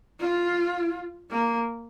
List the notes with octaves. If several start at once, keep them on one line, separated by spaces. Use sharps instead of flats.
F4
A#3